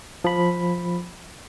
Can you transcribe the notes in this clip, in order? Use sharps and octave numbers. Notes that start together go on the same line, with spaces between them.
F3 B5